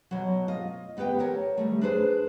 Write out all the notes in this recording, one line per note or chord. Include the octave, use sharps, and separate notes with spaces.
B2 F#3
F4 D#5
D2 B3 G4 B4 G5
G4 A4 A#4 C#5
D#3 G3 A3
D4 G#4 B4 C5